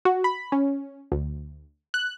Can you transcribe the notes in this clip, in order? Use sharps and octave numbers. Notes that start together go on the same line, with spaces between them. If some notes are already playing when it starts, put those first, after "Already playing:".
F#4
B5
C#4
D2
F#6